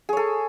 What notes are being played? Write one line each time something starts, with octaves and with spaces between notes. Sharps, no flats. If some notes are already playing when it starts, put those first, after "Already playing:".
G#4 A4 C#5